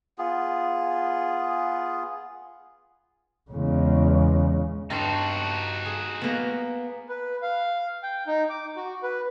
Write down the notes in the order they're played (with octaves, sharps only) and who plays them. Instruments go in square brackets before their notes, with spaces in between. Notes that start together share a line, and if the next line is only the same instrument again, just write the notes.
[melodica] B3 F4 G#4
[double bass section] E2 [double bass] C#3 G#3
[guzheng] G2 A5 C6 [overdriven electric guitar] D#4 F#4
[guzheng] G#4
A#3 B3
[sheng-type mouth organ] B4
F5
G5
D#4
D6
F#4
B4